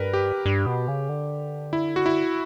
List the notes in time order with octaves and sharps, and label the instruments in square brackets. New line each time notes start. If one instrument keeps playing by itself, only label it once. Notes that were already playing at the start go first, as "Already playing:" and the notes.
Already playing: [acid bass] G2 [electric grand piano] A#4 B4
[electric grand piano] G4
[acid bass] G2
B2
C#3
D3
[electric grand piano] E4
F#4
E4